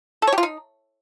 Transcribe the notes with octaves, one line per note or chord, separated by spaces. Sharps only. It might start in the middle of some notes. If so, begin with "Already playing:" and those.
A4
C#5
G4
F4
D#4